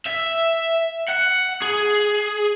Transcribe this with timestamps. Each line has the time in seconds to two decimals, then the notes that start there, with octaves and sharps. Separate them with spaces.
0.07 E5
1.08 F#5
1.62 G#4